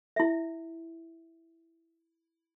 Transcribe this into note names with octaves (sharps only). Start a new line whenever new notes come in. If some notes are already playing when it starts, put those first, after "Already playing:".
E4 E5